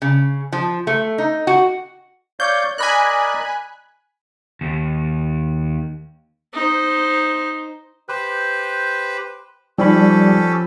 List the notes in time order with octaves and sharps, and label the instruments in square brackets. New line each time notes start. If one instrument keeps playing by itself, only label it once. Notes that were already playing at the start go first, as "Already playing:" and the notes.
[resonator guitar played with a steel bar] C#3
F3
A3
D#4
F#4
[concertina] C#5 D5 F5 [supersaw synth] G6
[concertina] A#4 D5 D#5 [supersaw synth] G#5 B5 F#6
[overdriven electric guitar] D#2
[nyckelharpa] D#4 C5
[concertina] G4 B4 C5 [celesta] F#6
[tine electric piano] F3 B5 [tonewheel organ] G3 [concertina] C#4 G4 A4 [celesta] D#4